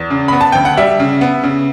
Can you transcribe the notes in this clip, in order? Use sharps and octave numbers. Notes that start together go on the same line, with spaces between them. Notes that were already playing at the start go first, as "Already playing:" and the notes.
Already playing: E2
C#3
B3 B5
A5
D2 G5
F#5
G3 E5
C#3
B3
C#3